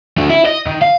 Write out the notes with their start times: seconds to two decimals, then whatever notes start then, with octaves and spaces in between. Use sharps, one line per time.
0.17 A3 D4
0.29 E4
0.46 D#5
0.67 D#3
0.82 F5